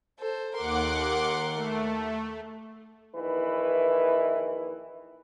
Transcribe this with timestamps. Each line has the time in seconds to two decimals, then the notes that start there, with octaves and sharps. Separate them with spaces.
0.19 A4 C5
0.55 D#2 A#4 F#5 C6 D6
1.55 A3
3.15 A#1 D#3 E3 E4 B4